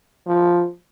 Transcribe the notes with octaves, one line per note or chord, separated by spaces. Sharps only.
F3